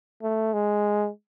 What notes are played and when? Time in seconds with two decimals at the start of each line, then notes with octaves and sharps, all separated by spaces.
0.23 A3
0.54 G#3